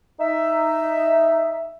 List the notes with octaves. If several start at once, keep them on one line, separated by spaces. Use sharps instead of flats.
D#4 E5